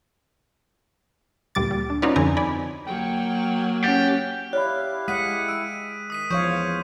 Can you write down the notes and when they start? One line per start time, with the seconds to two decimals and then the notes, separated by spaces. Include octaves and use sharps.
1.55 D2 A#2 G3 D6 A6
1.71 G3
1.90 D4
2.02 C#4 D#4 F4 F#4 B4 D5
2.16 F2 D3 C4 G#5 A#5
2.37 D5 G#5 B5
2.87 F#3 A#3 G5
3.84 C#4 G4 F#5 A6
4.53 E4 G4 C#5 D5 F5 B5 F#6
5.08 G#3 F#5 D#6 B6 D#7
5.48 E6 D7 D#7
6.10 D#3 D#6 B6 D#7
6.30 E2 F3 C5 C#5 F5 C#6 D#6 G6